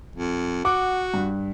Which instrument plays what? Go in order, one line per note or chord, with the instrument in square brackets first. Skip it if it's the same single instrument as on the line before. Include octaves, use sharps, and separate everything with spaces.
[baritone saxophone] F2
[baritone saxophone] F#4 [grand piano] F#5 D6
[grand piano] G2